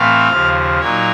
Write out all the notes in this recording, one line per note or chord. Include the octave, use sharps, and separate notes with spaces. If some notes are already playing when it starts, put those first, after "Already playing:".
Already playing: A2 E3 A3 C4 F5
D#2 C#3 F3
A#2 F#3 A#3 D#4 C#5